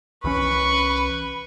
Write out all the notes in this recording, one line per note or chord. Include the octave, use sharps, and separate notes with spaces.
C2 E3 C#4 B4 B5 C#6